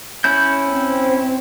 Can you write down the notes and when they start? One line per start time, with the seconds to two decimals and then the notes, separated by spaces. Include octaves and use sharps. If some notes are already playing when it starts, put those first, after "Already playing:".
0.24 C#4 E4 G6
0.68 C4